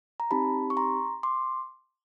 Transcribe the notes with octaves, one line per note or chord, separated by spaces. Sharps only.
A#5
C4 D#4 G4 A5 B5
C#6
A#5 C6
C6 D6